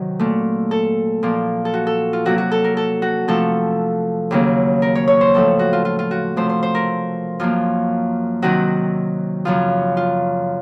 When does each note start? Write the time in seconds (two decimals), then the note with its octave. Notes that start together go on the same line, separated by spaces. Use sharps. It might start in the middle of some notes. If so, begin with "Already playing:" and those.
Already playing: C3 D#3 F#3
0.20 A#2 A3
0.71 A4
1.23 A#2 F3 A#3
1.65 A4
1.74 F#4
1.87 A4
2.13 F4
2.25 C3 F#3 A#3 F#4
2.38 F#4
2.52 A4
2.64 A#4
2.77 A4
3.02 F#4
3.28 C3 F3 A3 A4
4.31 D#2 C#3 F#3 A#3
4.82 A#4
4.95 C#5
5.08 C#5
5.21 C5
5.34 A2 F3 A3 A4
5.59 F#4
5.73 F4
5.85 F4
5.99 F4
6.11 F#4
6.36 C3 F3 A3 C5
6.49 C5
6.63 C5
6.75 A#4
7.39 F#2 F3 A#3 F4
8.42 C3 D#3 F#3 F#4
9.45 F#2 C#3 F3 F4
9.97 F4